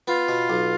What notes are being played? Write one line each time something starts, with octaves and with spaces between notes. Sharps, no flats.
B3 F4
B2
B1